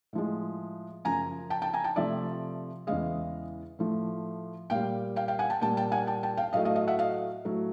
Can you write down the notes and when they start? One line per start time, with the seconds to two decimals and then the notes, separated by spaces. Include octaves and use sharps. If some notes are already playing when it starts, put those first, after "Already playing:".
0.13 A2 F3 G#3
1.05 F#2 C#3 F3 G#5 A#5
1.50 G5 A5
1.62 G5 A5
1.74 G#5 A#5
1.84 G5 A5
1.96 C3 F3 A3 D5 E5
2.87 E2 C#3 E3 G#3 D#5 F5
3.79 A2 F3 A3
4.70 A#2 G3 F5 G5
5.16 F5 G5
5.28 F5 G5
5.39 F#5 G#5
5.50 G5 A5
5.61 A#2 G3 G5 A5
5.77 G5 A5
5.92 F#5 G#5
6.07 G5 A5
6.23 G5 A5
6.37 F5 G5
6.53 A2 F#3 A3 D#5 F5
6.65 D#5 F5
6.76 D#5 F5
6.88 E5 F#5
6.99 D#5 F5
7.45 A2 F#3 A3